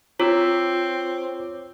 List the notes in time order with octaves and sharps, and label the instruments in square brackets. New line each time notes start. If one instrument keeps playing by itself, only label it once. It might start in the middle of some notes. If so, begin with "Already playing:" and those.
[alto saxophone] C4 [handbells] F4 [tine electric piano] C#5 D6 E6